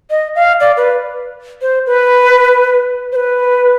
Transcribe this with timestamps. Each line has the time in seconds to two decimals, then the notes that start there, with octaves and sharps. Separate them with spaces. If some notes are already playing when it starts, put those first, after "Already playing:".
0.10 D#5
0.35 F5
0.60 D5
0.77 B4
1.62 C5
1.86 B4
3.12 C5
3.16 B4